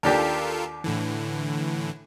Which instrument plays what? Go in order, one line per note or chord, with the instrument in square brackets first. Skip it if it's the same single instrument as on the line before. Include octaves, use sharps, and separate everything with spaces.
[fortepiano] D#2 D4 G4 [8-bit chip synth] F4 A4 A#4
[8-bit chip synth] A2 D3 E3